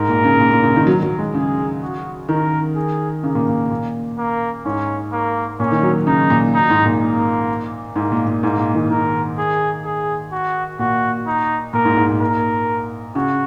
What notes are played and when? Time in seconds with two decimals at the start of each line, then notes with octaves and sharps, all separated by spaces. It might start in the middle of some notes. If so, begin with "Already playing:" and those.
Already playing: G#2 A#4
0.09 A#2
0.24 C#3
0.40 A#2
0.52 A#2
0.64 C#3
0.76 D#3
0.87 F#3
1.03 F#3
1.19 G#3
1.34 C#3 G#4
1.82 F#4
2.29 D#3 A#4
2.76 G#4
3.23 C#3 A#3
3.35 A#2
3.48 A#2
3.70 A#2
4.18 A#3
4.65 G#2 C#4
5.12 A#3
5.60 A#2 C#4
5.72 D#3
5.83 F#3
6.07 C#3 D#4
6.30 A#2
6.54 D#4
6.70 G#2
6.85 A#2
7.01 A#3
7.96 G#2 A#3
8.12 A#2
8.27 A#2
8.43 G#2 A#3
8.58 A#2
8.75 D#3
8.90 D#3 A#4
9.38 G#4
9.85 G#4
10.32 F#4
10.79 A#2 F#4
11.27 D#4
11.73 A#2 A#4
11.85 G#2
11.97 G#2
12.09 A#2
12.21 A#4
13.15 C#3 F#4